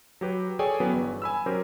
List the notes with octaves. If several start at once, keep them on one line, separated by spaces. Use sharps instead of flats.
F#3 G4 B4
G#4 A4 C#5 D5 G5 G#5
E3 F#3 B3 C#4 B4
G1
G#5 B5 E6
F#3 C#4 G4 A#4 C5